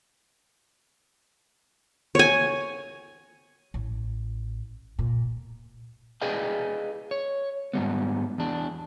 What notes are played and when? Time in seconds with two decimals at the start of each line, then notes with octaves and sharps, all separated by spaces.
2.15 C#5 G#5
3.74 A1
4.99 A#2
6.22 G#4 B4 D5 D#5 F5 G5
7.11 C#5
7.73 G#2 C3 G3 B3
8.38 E2 D4